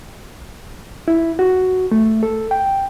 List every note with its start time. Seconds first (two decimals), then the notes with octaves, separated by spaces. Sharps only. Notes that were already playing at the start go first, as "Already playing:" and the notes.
1.08 E4
1.39 F#4
1.91 A3
2.23 A4
2.51 G5